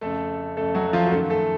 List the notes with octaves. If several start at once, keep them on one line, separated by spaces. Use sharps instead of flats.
F2 C#3 A3 A4
F2 C#3 A3 A4
F#3 F#4
F3 F4
F#4
F#2 D#3 A3 A4
A3 A4